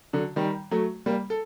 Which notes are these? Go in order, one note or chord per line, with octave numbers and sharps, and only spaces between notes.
D3 F#3
D#3 G3
F#3 A3
G3 A#3
A4